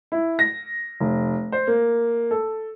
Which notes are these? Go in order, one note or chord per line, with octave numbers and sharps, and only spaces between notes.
E4
A#6
F1
C5
A#3
A4